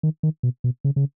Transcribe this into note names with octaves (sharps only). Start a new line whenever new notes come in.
D#3
D#3
B2
B2
C#3
C#3